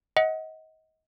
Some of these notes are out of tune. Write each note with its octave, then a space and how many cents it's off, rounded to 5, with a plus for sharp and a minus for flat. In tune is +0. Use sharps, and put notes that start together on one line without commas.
D#5 +30 F#5 +0